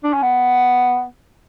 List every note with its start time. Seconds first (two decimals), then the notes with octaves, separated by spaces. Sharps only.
0.04 D4
0.13 C#4
0.22 B3